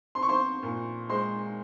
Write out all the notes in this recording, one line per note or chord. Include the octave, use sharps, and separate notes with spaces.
C4 C6
C#6
C5 C6
A#2
G#3 C5 C6